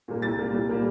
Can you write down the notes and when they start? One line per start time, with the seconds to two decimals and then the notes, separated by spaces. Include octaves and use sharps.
0.08 A#2 G3 A#3
0.22 C2 A6
0.38 A#2 G3 A#3
0.54 C2
0.69 A#2 G3 A#3